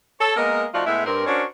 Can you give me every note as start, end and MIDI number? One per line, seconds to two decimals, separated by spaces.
0.20 0.36 69
0.20 0.36 73
0.37 0.65 56
0.37 0.65 58
0.37 0.65 59
0.37 0.65 70
0.37 0.65 75
0.74 0.82 53
0.74 0.82 57
0.74 0.82 63
0.74 0.82 65
0.74 0.82 66
0.74 0.82 74
0.86 1.06 45
0.86 1.06 56
0.86 1.06 59
0.86 1.06 64
0.86 1.06 68
0.86 1.06 76
1.06 1.25 43
1.06 1.25 60
1.06 1.25 70
1.27 1.43 61
1.27 1.43 62
1.27 1.43 66
1.27 1.43 70
1.27 1.43 72
1.27 1.43 73